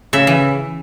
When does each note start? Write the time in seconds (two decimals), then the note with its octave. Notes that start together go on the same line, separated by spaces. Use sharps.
0.13 C#3 E5
0.27 E3